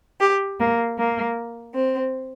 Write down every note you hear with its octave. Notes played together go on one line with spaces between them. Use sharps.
G4
A#3
A#3
C4